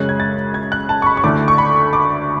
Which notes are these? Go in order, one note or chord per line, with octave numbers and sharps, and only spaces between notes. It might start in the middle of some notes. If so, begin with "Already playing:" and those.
Already playing: F#2 C#3 G#3 C#4 F#6
G#6
A6
G#6
F#6
A5
C#6
B5
C#6
D2 D3 A3 E4 D6
C#6
B5
D6